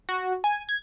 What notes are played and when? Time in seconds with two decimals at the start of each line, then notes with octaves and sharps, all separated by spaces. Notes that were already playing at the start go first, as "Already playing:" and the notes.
0.09 F#4
0.44 G#5
0.69 G#6